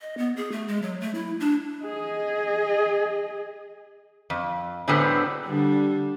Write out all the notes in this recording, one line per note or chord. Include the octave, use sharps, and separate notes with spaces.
D#5
B3
G#4
A3
G#3
F#3
A3
E4
D4
G#4 D#5
F2
A2 D3 F#3 G#3 B3 C4
D3 G3 D4